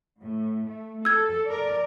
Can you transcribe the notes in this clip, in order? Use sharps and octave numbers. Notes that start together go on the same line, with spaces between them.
A2
A3
A4 E6 G#6
A#4 D5